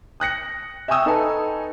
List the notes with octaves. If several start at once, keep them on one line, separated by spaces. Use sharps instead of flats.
D#6 F#6 A#6 C#7
E5 G5 G#5 C#6 D#6 E6
D#4 A4 B4 G#5 A5